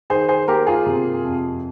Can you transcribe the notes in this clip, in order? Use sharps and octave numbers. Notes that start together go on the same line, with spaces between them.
D#3 G#4 C5
G#4 C5
A#3 G4 A#4
F4 G#4
C3
F2